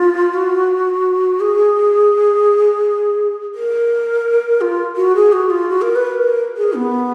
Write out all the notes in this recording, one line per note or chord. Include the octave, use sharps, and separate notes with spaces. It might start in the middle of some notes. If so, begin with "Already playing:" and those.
Already playing: F4
F#4
G#4
A#4
F4
F#4
G#4
F#4
F4
F#4
A#4
B4
A#4
G#4
B3